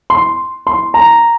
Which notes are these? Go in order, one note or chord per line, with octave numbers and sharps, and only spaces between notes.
C6
C6
A#5